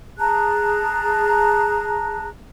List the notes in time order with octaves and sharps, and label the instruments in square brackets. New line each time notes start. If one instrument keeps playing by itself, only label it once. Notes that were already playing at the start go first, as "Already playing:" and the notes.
[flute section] G#4 A5 A#5 F#6